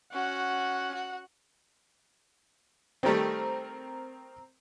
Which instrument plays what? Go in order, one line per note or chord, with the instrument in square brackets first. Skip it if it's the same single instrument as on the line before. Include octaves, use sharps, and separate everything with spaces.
[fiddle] C#4 F#4 [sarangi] F#5
[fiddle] F#4
[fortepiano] D#3 G3 A3 [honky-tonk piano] C4 A#4